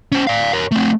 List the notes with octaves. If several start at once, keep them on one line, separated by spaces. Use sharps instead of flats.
C#4 C5
D5 F5
A#4 C#5
A3 C4